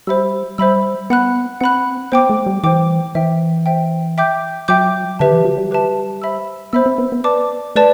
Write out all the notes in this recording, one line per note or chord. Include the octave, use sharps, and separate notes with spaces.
G3 C5 E5 B5 E6
G3 C5 E5 B5 E6
B3 F#5 B5 F#6
C4 F#5 B5 F#6
B3 C5 G5 D6
A3
G3
E3 C5 G5 D6
E3 C5 E5 G5
C5 E5 G5
E5 G5 D6 G6
F#3 E5 G5 D6 G6
D3 G4 B4 E5 A5
E3
F#3
G3
G4 B4 E5 A5
C5 E5 B5 E6
B3 C5 E5 B5 E6
C4
B3
B3
B4 D5 A5 D6
A3 B4 D5 A5